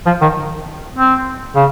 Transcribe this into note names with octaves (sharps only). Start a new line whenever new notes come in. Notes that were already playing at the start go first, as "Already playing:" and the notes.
F3
D#3
C4
C#3